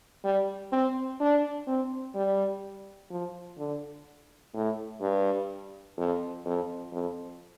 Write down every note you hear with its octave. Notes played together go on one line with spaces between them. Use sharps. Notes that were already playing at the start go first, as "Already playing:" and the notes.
G3
C4
D4
C4
G3
F3
D3
A2
G2
F2
F2
F2